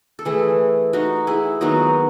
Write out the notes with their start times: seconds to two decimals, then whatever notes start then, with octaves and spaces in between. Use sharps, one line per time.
0.19 A4
0.25 E3 A3 E4 G#4
0.93 D#4 F#4
1.27 E4 G#4
1.61 D#3 F#3 B3 D#4 F#4